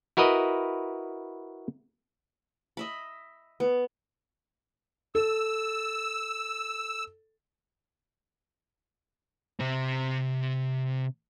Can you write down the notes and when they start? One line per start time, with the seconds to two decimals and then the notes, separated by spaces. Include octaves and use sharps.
0.17 E4 F#4 A#4 B4 D#5
2.77 D#5 E5 B5
3.60 B3
5.15 A4 E6
9.60 C3 C4